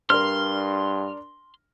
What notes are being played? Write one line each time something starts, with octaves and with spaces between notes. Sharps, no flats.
G2 D4 A#4 C6 F6